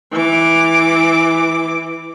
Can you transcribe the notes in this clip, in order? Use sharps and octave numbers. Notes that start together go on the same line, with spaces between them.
E3 D6